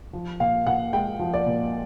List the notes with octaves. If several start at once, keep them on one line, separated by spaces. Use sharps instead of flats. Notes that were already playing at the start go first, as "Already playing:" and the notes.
F3
A#2 F5
A#2 F#5
G#3 G5
F3
D5
A#2